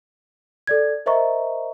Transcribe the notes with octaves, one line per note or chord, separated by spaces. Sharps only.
A4 D5 G#6
A#4 C5 D#5 E5 A#5 C#6